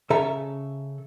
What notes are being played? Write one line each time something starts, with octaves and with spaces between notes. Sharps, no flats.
C#3 A4 E5 A#5